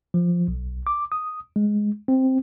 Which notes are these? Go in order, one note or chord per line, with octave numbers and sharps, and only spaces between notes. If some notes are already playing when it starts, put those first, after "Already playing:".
F3
B1
D6
D#6
G#3
C4